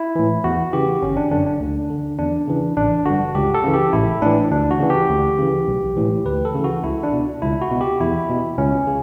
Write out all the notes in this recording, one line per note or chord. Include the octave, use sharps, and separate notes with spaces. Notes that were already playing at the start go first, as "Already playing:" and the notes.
Already playing: E4
A2 E3
E2 F#4
C#3 E3 G4
G1 C#4
D4
F#2 D3 D4
D4
D2
D3
E2 D4
C#3 E3
A1 D4
G2 D3 F#4
C#2 G4
A4
C#3 E3
G4
A1 E4
A2 E3 D4
D2 D4
F#4
C#3 E3
G4
D2
C#3 E3
B1
A2 E3
D2 B4
A4
C#3 E3
F#4
C#2 E4
D4
B2
C#2 E4
F#4
B2
G4
E2 E4
B2
C#2 C#4
C#3